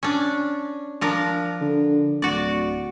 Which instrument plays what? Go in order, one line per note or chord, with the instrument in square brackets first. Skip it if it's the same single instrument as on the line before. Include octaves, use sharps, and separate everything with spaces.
[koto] C#4 D4
F3 D4 A#4
[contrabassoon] D3
[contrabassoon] D1 [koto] F#4 D5